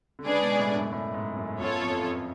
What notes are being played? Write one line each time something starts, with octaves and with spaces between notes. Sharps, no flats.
D3
C#3 G#3 D4 G#4 B4 D5
B2
A2
F#2
A2
G#2
F#2
F#2 B3 F4 A4 C#5
F2
F2